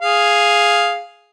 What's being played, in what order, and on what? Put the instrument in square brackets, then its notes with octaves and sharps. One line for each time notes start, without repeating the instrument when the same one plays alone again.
[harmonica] G#4 F5